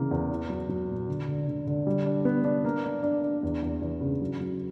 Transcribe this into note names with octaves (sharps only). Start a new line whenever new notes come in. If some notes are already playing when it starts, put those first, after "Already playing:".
Already playing: C#3 E3 A#3
E2
E4
F#3
F#3
A#2
D3
D3
D3
D3
G3
D4
B3
D4
A#3
D4
D4
D4
E2
E2
E2
C#3
F#3
F#3